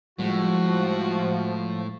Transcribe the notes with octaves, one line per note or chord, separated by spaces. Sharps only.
A2 F3 G3 G#3 F#4